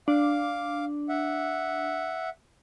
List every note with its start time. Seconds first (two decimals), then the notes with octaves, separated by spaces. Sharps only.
0.08 D4 F5 D6
1.09 E5 F#5